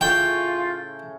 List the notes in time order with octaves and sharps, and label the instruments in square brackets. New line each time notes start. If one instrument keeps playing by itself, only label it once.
[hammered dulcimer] A2 C#3 C#5 [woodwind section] F4 [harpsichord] G5